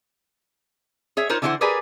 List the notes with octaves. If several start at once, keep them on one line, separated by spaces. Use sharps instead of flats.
G#4 C#5 E5
D#4 F4 A#4 C5 C#5
D3 E3 E4 F#4 C5 F#5
G4 G#4 A#4 B4 D5 G#5